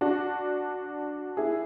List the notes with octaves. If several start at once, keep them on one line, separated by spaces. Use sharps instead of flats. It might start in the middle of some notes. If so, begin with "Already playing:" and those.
D4 F#4
E4 G#4